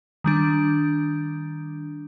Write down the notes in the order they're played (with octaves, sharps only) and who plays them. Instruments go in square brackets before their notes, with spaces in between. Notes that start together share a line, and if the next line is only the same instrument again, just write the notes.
[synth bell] D#3 G3 D4